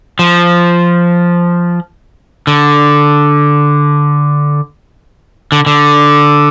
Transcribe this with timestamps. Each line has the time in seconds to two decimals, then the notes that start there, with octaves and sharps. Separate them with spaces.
0.19 F3
2.47 D3
5.52 D3
5.66 D3